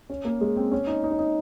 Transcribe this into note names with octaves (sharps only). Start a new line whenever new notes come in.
C#4
A#3
G#3
C4
C#4
D#4
D#4
C#4
D#4